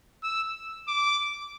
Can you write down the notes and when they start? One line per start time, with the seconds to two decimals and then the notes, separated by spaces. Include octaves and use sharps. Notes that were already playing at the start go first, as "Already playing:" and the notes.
0.23 E6
0.88 D6